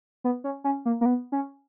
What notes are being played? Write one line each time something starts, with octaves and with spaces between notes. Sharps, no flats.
B3
C#4
C#4
A#3
A#3
B3
C#4